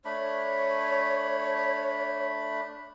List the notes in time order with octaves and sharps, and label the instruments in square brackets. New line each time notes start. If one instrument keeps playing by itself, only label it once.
[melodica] A3 D4 B5 [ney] C#5